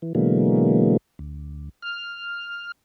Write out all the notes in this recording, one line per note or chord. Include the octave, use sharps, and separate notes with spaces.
E3
B2 D3 E3 F#3 G#3 A#3
D2
F6